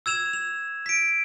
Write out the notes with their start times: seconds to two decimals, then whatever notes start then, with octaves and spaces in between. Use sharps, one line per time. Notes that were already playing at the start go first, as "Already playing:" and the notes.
0.06 E6 G#6 E7 F7
0.33 F7
0.86 B6 D7